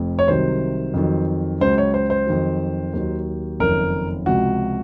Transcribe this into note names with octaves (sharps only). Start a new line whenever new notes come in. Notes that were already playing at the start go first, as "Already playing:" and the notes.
Already playing: F1 F2
C#5
C2 C3 D#3 F#3 C5
F2 D#3 F#3
C#2 C#3 F#3 C5
C#5
C5
C5
F2 D#3 F#3
D#2 D#3 F#3
F#1 F2 D#3 A#4
C#2 C3 F3 F#4